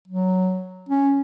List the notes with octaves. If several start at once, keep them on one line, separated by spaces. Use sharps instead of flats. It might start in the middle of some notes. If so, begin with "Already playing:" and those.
F#3
C#4